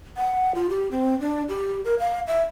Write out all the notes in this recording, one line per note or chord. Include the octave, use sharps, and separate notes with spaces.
F#5
F4
G4
C4
D4
G4
A#4
F5
E5